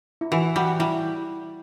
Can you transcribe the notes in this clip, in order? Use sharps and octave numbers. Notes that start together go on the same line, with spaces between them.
E4
E3 F#4
G3 F#4
G3 E4